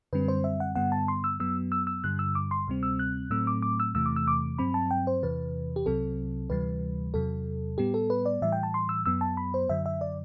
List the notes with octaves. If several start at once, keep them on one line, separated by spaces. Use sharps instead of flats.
F#2 D3 G3 C4 B4
C5
E5
F#5
G2 D3 G3 B3 F#5
A5
C6
E6
F#2 F#3 B3 E6
E6
E6
G2 D3 G3 F#6
E6
D6
C6
D2 C3 G3 C4
E6
F#6
A2 F#3 A3 C4 E6
D6
D6
E6
E2 C3 E3 A3 E6
D6
E6
D6
G2 F#3 C4 B5
A5
G5
C5
E2 C3 E3 B4
G4
C2 C3 F#3 C4 A4
D2 C3 E3 G3 B4
E2 C3 F#3 A4
A2 G3 B3 G4
A4
B4
D5
A2 E3 G3 E5
G5
A5
C6
E6
F#2 F#3 B3 E6
A5
B5
C5
F#2 D3 F#3 E5
E5
D5